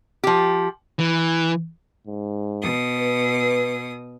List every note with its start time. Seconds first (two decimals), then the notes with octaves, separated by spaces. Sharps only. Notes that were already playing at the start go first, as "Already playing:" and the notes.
0.24 F3 G4
0.99 E3
2.07 G#2
2.62 B2 D#6
2.99 B4